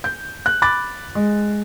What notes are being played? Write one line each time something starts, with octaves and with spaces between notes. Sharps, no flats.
G6
F#6
B5 D6 F#6 A6
G#3